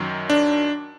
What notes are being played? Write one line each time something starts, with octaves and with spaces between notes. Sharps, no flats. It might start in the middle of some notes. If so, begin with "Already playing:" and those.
Already playing: F#2 D#3 F#3
D4